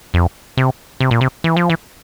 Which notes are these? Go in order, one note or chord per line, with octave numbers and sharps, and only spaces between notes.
F2
C3
C3
A#2
C3
E3
F3
E3